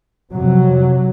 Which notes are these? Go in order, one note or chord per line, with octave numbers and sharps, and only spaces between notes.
F2 C3 F#3